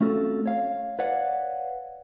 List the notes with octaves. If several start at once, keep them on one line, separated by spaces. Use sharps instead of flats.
A3 C4 C#4 F4 F#4 A4
C#5 F5
B4 C#5 D5 F5 F#5